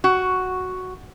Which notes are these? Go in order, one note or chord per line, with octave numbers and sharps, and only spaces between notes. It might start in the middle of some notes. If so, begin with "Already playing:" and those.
F#4